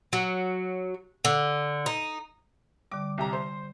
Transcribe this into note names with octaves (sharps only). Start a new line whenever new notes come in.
F#3
D3
D#4
D3 G3 D6
C2 G4 A#5
C5